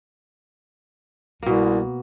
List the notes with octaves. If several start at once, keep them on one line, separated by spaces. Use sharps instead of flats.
C2 B2 A#3